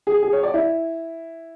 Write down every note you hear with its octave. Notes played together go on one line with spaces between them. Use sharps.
G#4
G#4
C#5
D5
E4